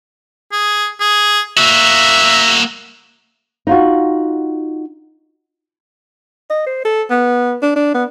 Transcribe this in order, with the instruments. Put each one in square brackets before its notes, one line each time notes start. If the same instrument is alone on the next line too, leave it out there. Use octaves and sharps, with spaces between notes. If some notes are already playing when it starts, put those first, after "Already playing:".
[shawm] G#4
G#4
[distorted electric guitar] A#3 F#4 [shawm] E5
[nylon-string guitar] D#4 F4 F#4
[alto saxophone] D#5
C5
A4
B3
D4
D4
B3